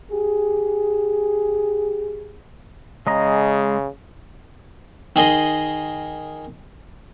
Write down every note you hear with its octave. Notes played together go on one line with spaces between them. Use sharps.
G4 G#4
C#3 G#3 D#5 A#5
D#3 G#4 D#5 C6